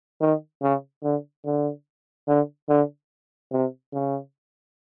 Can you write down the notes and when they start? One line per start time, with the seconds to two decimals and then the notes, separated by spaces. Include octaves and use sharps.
0.21 D#3
0.62 C#3
1.04 D3
1.45 D3
2.28 D3
2.69 D3
3.52 C3
3.93 C#3